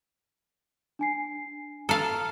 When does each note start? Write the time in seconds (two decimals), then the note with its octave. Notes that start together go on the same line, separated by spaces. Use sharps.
0.99 D4 G#5 C7
1.89 A4 F5 A5 A#5 F6